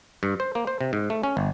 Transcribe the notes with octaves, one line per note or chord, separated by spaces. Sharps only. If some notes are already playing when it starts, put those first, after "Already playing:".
G2
C5
A#3
C5
C3
G#2
A3
C#4
G1